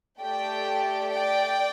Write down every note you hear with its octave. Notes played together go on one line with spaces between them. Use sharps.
A3 G4 D5 G5
D5 G5